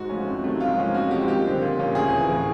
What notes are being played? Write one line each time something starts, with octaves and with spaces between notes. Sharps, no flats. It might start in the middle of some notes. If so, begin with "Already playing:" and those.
Already playing: G#2 F#4
F3 A3 C#4
F2
C3 D#3 F#3 A3
G#2 F4
F3 A#3 C#4
F2 F#4
C3 F3 G#3 G4
D#2 G4
D3 G3 C4
A#2
F3 A#3 C#4
D2 G#4
C3 E3
A2